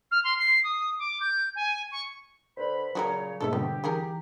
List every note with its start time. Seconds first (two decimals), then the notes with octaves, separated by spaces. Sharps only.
0.11 F6
0.24 C6
0.39 C7
0.63 D#6
0.98 D6
1.20 G6
1.55 G#5
1.91 C#6
2.57 D3 B4 C5 B5
2.95 A#2 C#3 F#3 F#4 G4 A#4 C#5
3.40 G#2 B2 G#3 A#3 A4 C#5 E5
3.53 D3 F3 G3 B3 G4
3.84 D#3 E3 G#4 A#4